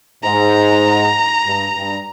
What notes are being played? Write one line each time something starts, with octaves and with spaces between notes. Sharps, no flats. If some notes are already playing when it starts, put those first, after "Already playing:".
G#2 A#5
G2
G2